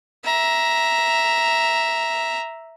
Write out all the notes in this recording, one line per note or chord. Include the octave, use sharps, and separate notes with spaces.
E5 A#5